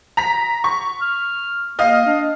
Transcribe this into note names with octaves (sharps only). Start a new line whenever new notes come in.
A#5 B6
C#6
F6
A#3 D#5 F5 F6
D4